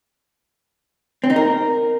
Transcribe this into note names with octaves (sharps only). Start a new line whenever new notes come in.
C4
D#4
A#4